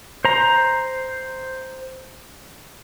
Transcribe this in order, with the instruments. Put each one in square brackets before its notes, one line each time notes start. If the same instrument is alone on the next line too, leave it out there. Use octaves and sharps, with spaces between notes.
[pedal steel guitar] C5 A#5